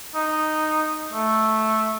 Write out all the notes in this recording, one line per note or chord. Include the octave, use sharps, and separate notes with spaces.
D#4
A3